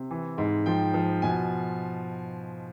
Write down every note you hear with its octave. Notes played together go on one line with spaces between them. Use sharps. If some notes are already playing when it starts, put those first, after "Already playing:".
Already playing: C3
E3
G#2
F3 G5
F3
B2 G#5